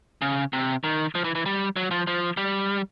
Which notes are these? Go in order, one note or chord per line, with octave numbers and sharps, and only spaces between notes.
C#3
C3
D#3
F3
E3
E3
G3
F#3
F3
F3
G3